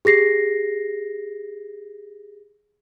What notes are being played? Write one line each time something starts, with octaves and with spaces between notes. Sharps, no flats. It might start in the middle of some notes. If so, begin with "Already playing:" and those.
G4 G#4 A#6 C7